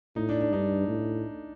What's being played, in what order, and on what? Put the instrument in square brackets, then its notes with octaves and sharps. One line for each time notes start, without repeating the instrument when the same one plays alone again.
[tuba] A2 [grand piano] D#4
[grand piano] D4
D4
[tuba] G2 [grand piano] D#4
[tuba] A2